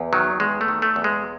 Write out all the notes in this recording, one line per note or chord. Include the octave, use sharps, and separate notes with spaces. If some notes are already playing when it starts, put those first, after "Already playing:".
Already playing: E2
D#3 F#3
E2 G#3
A3
D#3
A3
E2
G#3